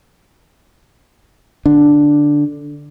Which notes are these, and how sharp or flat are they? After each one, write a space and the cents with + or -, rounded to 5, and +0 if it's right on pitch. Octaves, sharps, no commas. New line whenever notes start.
D3 +0 D4 +0